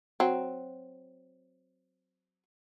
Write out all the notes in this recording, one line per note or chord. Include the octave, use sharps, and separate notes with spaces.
F#3 C4